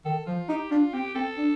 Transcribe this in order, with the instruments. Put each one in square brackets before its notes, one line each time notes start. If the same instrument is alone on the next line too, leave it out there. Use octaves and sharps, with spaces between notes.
[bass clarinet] D#3 [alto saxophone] A4
[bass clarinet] F3 [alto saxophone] F4
[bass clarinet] D#4 [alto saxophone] G4
[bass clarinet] D4 [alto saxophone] F4
[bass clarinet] C4 [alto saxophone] G4
[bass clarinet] C4 [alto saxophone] A4
[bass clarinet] D4